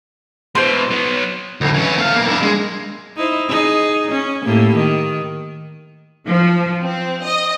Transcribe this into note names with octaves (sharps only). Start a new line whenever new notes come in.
B2 E3 C5 C6
F#3 B3
D2 A2
E3 C#4
A3 F5
B1 A#3
D4 E4
G#3
D#4 E4 C5
D#4 G#4
C#4
A2 A#3 G4
D#3
F3
C4
D#5